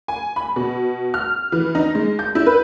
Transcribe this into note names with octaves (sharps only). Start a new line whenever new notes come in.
G#5
B5
B2
F6
E3
D#4
G#3
G6
E4
B4